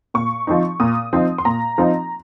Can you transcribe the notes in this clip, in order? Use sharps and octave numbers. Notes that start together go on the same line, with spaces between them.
A#2 C#6
F3 C4 D#4
A#2 D#6
F3 C4 D#4
C6
A#2 A#5
F3 C4 D#4